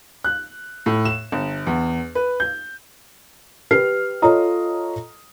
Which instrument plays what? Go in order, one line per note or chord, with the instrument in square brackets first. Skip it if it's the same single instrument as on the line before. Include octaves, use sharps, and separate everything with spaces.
[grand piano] F#6
A2
E7
G1
E2
B4
G6
[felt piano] G4 B4 F6 C7
F4 A4 C#5 D#5 A#5 D#6